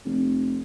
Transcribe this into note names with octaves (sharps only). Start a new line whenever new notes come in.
F1